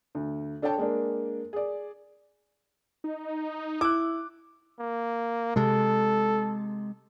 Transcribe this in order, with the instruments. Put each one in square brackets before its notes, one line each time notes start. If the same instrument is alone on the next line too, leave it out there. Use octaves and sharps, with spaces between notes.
[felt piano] D2
D4 A4 C#5 D5 G5 A5
G#3 A#3 D4
G#4 D5
[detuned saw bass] D#4
[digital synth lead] E4 [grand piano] D6 F#6
[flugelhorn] A#3
[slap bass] C3 G#3 [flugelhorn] A4